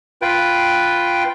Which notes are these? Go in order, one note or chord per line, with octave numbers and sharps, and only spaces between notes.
F4 B4 G5